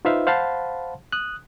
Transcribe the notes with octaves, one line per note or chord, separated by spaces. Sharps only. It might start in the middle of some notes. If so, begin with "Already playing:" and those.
D#4 F4 B4 C5 E5 F5
C5 F5 F#5 A5 B5 C6
D#6 F#6